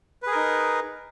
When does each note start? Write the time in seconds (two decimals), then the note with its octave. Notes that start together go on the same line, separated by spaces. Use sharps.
0.23 B4
0.27 G#4
0.31 A#4
0.36 D#4